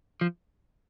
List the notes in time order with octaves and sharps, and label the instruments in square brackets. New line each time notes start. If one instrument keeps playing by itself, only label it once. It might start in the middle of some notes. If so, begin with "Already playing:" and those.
[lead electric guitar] F3